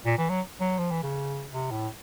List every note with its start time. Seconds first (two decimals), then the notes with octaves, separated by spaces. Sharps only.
0.06 A#2
0.18 E3
0.29 F#3
0.61 F#3
0.79 F3
0.91 E3
1.03 C#3
1.53 C3
1.71 A2